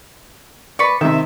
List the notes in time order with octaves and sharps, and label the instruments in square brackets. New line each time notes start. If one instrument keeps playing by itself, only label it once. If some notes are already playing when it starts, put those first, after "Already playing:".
[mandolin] B4 C#6 [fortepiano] D5
[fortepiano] C3 D#3 [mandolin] E5